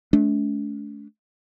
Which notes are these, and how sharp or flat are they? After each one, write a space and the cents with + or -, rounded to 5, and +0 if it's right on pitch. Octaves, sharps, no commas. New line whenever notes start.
A3 -40 D4 -45